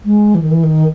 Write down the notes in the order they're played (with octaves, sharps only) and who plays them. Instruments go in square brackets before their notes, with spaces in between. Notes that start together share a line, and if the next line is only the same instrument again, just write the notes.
[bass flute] G#3
E3
D#3
E3
D#3